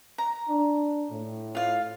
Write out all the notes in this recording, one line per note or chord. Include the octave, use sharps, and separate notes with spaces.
A#5
D4
A2
F4 F5